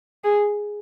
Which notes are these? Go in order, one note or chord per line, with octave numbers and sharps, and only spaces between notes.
G#4